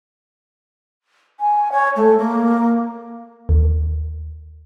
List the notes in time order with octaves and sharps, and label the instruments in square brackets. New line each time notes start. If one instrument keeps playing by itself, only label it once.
[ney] G#5
C#5
A3
A#3
[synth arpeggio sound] D#2